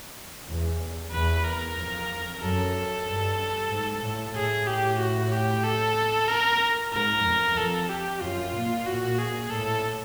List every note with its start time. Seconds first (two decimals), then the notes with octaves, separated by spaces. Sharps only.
0.48 E2
1.12 E2 B4
1.45 A#4
1.76 F2
2.41 F#2 A4
3.06 G2
3.70 G#2
4.02 A2
4.35 A2 G#4
4.67 G4
4.99 F#4
5.32 G4
5.64 A4
6.28 A#4
6.93 G#2 A#4
7.25 F2
7.57 F2 A4
7.89 G4
8.21 F#2 F4
8.54 A#2
8.86 A#2 F#4
9.18 G#4
9.50 A2 A4